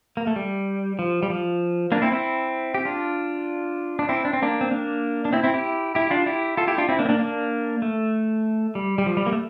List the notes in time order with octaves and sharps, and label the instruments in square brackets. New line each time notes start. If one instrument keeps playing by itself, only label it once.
[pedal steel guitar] A#3
A3
G3
F3
G3
F3
A#3 D4
C4 E4
C4 E4
G4
D4 F4
D4
C4 E4
D4
C4
A#3 D4
C4
A#3 D4
D4
C4 E4
C4 E4
E4 G4
E4 G4
D4 F4
E4 G4
F4 A4
E4 G4
D4 F4
C4 E4
A#3 D4
C4
A#3 D4
A#3 D4
A3
G3
G3
F3
G3
A#3
A3